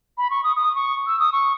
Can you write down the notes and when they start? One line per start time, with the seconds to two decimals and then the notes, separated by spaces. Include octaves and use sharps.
0.18 B5
0.30 C#6
0.44 D#6
0.56 D#6
0.75 C#6
1.07 E6
1.19 D#6
1.32 C#6